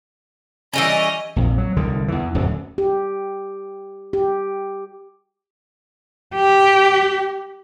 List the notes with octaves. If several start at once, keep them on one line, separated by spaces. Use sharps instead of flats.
E3 G3 C#4 D#5
A#1 F2
F#3
C2 D3 D#3
E2 E3
D1 F#2 D3
G4
G4
G4